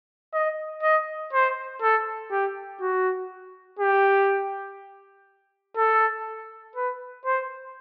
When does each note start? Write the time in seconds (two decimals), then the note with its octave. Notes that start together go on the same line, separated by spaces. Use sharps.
0.34 D#5
0.83 D#5
1.33 C5
1.82 A4
2.31 G4
2.81 F#4
3.79 G4
5.77 A4
6.76 B4
7.26 C5